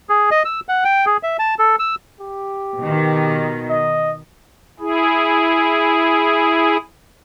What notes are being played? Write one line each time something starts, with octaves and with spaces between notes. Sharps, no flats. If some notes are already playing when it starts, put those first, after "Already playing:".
G#4
D#5
E6
F#5
G5
G#4
E5
A5
A4
E6
G4
B2 D#3
D#5
E4 G#4